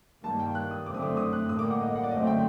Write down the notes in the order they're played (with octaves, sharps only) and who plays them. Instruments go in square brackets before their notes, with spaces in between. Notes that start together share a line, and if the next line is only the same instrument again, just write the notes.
[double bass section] G2 D#3 G3 A#3 [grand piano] A5
[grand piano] G5
F#6
D#6
[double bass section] F#2 D3 A3 C4 [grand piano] D6
[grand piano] D#6
D6
D#6
F#6
[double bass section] A2 G3 A#3 [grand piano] D#6
[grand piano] D6
F#5
D#5
F#5
D5
[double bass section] F#2 D3 A3 C4 [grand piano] D#5
[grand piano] G5